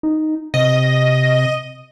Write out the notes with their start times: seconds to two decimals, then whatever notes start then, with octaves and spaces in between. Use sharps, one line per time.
0.03 D#4
0.54 C3 D#5